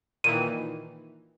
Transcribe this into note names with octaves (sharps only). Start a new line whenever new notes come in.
A#2 D#3 E3 D#7